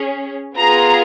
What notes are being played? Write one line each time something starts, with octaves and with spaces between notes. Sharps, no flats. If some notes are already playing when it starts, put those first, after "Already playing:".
Already playing: C#4 G#4
B3 F4 G#4 A#5